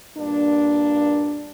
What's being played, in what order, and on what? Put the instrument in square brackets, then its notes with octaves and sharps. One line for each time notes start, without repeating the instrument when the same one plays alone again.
[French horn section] G2 A#2 A#3 D4